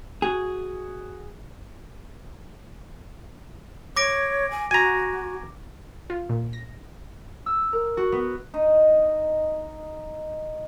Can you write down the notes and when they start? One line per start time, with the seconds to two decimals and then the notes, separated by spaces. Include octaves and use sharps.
0.22 F#4 G#4
3.96 C#5 D6 A#6 D7
4.51 G#5
4.71 F#4 G#5 A#5
6.10 F4
6.29 A#2
6.53 A#6
7.46 E6
7.73 A#4
7.97 F#4
8.12 B3
8.54 D#4 D#5